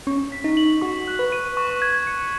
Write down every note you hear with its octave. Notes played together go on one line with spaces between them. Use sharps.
C#4 C#6
B6
D#4
F#7
F#4 C#6
F#6
B4
D#7
C#6
G#6
C#7